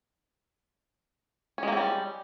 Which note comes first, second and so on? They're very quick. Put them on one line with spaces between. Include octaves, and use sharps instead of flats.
C#4 G#3 A#3 C4 G3